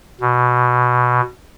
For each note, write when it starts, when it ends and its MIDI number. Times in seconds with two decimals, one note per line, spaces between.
0.21 1.21 47